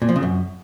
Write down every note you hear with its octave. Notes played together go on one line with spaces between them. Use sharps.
A#2
F3
C#3
F#2